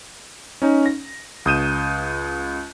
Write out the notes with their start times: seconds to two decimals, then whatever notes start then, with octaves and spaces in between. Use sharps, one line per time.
0.62 C#4 D#4
0.86 A#6
1.46 C#2 D#6 G6 D#7 E7